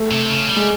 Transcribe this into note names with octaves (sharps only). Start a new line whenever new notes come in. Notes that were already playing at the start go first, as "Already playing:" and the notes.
Already playing: A3
C3
C#3
G3
G#3